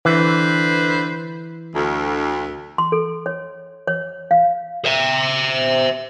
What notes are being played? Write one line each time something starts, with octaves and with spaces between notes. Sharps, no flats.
D3 E3 B4 C5
D2
C6
A4
C#5
C#5
F5
C5 E5